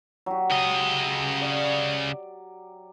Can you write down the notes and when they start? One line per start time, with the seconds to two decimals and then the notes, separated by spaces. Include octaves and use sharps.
0.26 F#3 G4
0.51 C#3 D#5
1.41 D5